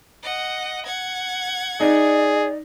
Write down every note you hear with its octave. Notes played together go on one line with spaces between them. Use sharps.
D#5 F#5
F#5 G#6
D#4 G#4 D5